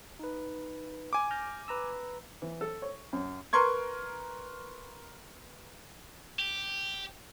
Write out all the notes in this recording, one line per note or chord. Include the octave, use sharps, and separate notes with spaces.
D#4 B4
G#5 D6
F6 G6 A#6
B4 A#5 E6
E3
A4
C#5
F#2
A#4 B4 C6 C#6 G#6
G4